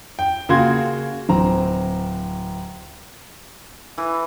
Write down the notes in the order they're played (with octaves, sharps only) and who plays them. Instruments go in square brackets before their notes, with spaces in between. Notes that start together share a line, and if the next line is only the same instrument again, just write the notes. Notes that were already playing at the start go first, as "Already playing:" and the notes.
[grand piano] G5
C#3 A#3 F#4 C6 G#6
D1 C4 A#5
[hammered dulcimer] E3